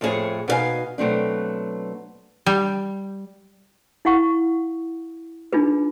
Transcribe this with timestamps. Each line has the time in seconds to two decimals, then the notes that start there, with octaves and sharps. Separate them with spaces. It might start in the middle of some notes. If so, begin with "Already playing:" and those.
0.01 F2 A2 C#4 G#4 C#5
0.48 B2 D#4 G4 D5 F5 G#5
0.98 B2 F#3 A3 C4 D4
2.46 G3
4.05 E4 F5 F#5 C#6
5.53 D4 D#4 F4 G#4 B4